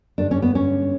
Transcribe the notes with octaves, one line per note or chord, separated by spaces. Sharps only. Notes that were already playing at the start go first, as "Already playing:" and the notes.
G2 D3 D4
C#4
B3
C#4